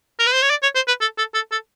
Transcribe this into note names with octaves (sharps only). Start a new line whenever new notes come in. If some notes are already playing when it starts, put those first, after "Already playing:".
A#4
B4
C5
C#5
D5
C#5
C5
B4
A4
A4
A4
A4